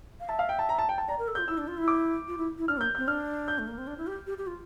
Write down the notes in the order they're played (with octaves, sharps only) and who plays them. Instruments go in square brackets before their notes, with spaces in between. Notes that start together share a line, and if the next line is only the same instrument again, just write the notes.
[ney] F5
[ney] E5 [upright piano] A5
[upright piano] F5
G5
A5
A#5
A5
G5
A5
[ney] D5 [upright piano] A#5
[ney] A#4
A4
[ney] F4 [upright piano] G6
[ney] E4 [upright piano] E6
[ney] D4
F4
E4
[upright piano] D6
[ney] F4
E4
E4
[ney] D4 [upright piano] F6
[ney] A#3
[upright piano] G6
[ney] C4 [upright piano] G6
[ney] D4 [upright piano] F6
[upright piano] G6
[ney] A3
A#3
C4
D4
E4
G4
G4
G4
F4